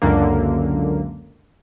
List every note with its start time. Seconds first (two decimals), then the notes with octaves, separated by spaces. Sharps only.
0.02 C#2 F#2 D3 A#3